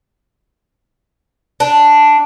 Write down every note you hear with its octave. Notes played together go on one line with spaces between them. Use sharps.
D4